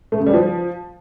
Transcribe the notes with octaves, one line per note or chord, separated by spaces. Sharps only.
A3
C#3
G3
F3